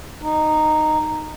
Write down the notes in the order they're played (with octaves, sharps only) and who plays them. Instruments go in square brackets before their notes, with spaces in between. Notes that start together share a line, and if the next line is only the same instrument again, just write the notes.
[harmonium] D#4